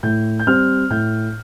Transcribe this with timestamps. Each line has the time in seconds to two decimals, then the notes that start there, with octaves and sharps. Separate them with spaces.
0.03 A2 G6
0.39 G6
0.47 G3 C4 F6
0.90 A2 G6